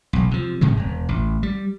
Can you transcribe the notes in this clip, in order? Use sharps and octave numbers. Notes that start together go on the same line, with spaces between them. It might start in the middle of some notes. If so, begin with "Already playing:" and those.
E1 B1
C3 F3
G#2 C3 D#3 G#3
E1
A1
G3